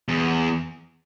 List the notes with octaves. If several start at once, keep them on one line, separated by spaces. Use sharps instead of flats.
E2